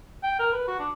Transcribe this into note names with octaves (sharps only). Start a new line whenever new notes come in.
G5
A#4
B4
F#4
D4